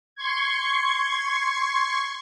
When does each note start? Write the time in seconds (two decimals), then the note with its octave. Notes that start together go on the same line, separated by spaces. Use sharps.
0.15 C6 C#6 G#6